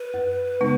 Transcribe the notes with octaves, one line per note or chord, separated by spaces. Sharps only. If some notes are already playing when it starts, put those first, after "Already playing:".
Already playing: B4
F#2
C#3 G#3 B3 D#4